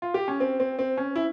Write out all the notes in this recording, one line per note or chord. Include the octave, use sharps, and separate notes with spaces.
F4
G4
C#4
C4
C4
C4
C#4
E4